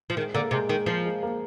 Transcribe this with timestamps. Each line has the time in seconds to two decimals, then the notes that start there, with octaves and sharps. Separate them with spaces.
0.10 F3
0.16 D#3 G#3
0.34 D3 A#3
0.51 C3 G#3
0.69 D#3 G#3
0.86 F3 A#3
1.05 G#3
1.23 A#3